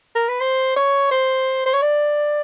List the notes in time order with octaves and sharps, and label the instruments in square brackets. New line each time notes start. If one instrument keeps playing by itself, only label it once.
[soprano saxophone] A#4
B4
C5
C#5
C5
C5
C#5
D5